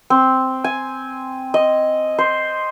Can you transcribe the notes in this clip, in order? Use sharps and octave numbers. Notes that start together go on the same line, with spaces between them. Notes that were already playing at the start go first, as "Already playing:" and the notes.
C4
G#5
D#5
C5